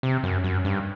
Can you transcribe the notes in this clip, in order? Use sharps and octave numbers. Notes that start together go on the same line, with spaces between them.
C3
F#2
F#2
G2